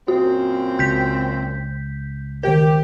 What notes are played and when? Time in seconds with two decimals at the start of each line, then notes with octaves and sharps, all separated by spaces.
0.08 F#2 A#2 C4 F#4
0.79 C#2 G6 B6
2.43 D#3 G4 A#4